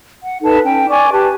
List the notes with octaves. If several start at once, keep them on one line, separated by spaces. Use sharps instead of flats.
F#5
D#4 A4 B4 A5
C#4 G5
D5 G#5 C#6 D6
G4 B4 A5